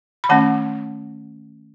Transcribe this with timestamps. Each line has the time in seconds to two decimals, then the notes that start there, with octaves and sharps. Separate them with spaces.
0.24 B5
0.29 D#3 A3 C#4 F#5 A5